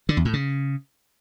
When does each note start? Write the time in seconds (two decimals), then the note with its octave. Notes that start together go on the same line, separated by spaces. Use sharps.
0.09 D3
0.17 E2
0.25 A2
0.33 C#3